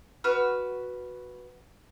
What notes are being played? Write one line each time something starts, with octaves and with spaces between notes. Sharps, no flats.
F#4 B4 F6